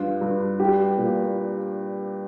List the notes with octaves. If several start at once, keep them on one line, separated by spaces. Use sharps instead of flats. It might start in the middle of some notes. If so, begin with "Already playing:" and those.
Already playing: G2 F4
G2
G3 G4
A#2